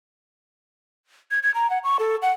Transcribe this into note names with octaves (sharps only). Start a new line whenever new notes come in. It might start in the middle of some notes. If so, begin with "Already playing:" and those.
G#6
G#6
A#5
F#5
C#6
A4
F#5